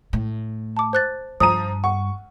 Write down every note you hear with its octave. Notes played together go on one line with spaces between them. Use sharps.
A2
A5 D6
C5 F#6 A6
G2 F3 A#5 D#6 D#7
F#5 C#6